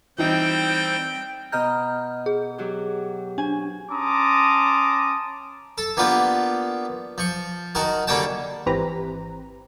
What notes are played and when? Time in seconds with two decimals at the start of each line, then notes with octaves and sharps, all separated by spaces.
0.18 E3 G3 C4 D#4 C5 G5
1.52 B2 D#5 A#5 F6 G6
2.26 G#4
2.58 F#3 F#4 G4
3.38 D4 G#5
3.91 C#4 A5 A#5 C6 D6 D#6
5.78 A4
5.97 A#3 B3 D4 F4 G4
7.18 F3 C#6
7.75 D#3 F#4 A#4 A5
8.07 D3 G3 A#3 C#4 G5 A5
8.66 G#1 E3 C4 G4 B4 A#5